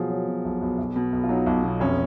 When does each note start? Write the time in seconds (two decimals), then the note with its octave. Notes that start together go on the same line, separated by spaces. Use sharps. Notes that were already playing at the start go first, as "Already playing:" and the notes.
Already playing: B2 F3 F#3 G#4
0.10 F#3
0.28 B2
0.45 B1
0.61 B1
0.78 B1
0.96 B2
1.12 B1
1.23 F4
1.29 F#3 D#4
1.46 B1
1.64 B2
1.80 F1 C#4